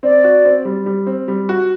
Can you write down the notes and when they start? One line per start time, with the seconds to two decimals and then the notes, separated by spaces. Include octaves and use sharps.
0.03 C4 D5
0.24 F#4
0.45 C4
0.65 G3
0.86 G3
1.07 C4
1.28 G3
1.49 F#4